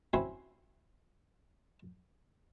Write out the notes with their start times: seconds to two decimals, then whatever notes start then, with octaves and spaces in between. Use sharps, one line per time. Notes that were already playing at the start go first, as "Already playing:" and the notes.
0.13 C4 C#4 E4 F#4 C#5 C6